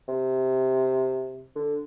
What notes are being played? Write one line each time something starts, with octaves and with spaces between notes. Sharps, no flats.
C3
D3